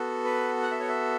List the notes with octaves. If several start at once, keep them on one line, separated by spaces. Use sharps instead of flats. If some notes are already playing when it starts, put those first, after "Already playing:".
Already playing: B3 F#4 A4
B4
F#5
E5
C#5
E5